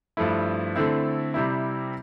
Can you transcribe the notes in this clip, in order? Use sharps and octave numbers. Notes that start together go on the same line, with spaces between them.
G2 F3 A3 E4
D3 A3 C4 E4
C3 G3 C4 E4